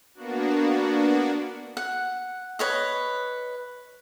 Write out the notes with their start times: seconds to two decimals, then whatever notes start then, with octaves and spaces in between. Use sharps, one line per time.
0.14 A#3 B3 D4 F#4
1.77 F#5
2.59 B4 C#5 D#5